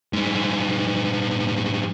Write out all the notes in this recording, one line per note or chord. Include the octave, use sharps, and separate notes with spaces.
G2 G#3